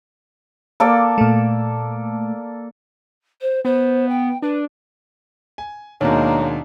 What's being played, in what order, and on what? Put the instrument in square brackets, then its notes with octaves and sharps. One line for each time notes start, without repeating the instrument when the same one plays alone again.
[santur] A#3 A4 D5
[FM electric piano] A#2 A3
[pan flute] C5
[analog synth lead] B3 [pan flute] C5
[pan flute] G5
[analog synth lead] D4 [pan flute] B4
[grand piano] G#5
[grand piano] D#2 B2 [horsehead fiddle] G#3 A#3 [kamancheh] D4 D#4 [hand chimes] C#5 A#5